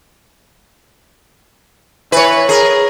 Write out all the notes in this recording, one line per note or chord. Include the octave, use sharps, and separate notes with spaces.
E3 B4 C#5
G#4 A#4